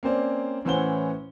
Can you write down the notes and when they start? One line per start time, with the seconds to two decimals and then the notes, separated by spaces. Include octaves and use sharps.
0.03 A#3 C4 C#4 C5 D5
0.65 A2 E3 C#4 C5 F#5 G7